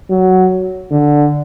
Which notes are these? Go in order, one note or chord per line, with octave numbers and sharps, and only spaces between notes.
F#3
D3